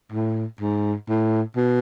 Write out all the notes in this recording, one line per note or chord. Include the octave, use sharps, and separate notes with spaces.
A2
G#2
A2
B2